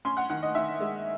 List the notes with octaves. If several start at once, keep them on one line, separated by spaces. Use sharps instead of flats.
C#4 C6
F#5
D#3 F#5
D#5
D#3 E5
G#3